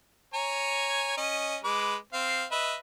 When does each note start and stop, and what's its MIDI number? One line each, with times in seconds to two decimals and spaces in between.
0.34 1.17 73
0.34 1.17 80
0.34 1.17 82
1.17 1.57 61
1.17 1.57 75
1.64 1.96 56
1.64 1.96 71
1.64 1.96 86
2.13 2.45 60
2.13 2.45 77
2.51 2.75 71
2.51 2.75 75
2.51 2.75 76